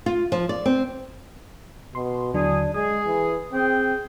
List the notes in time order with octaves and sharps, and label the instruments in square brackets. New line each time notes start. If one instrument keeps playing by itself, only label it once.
[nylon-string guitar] F4
F3
D5
C4
[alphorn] B2 [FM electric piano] C6
[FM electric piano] D#2 D3 F#3 [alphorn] D4 [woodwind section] E4 G#4
[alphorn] G#3 [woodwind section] G#4 [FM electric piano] D#6
[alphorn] E3
[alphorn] C4 [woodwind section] G#4 G5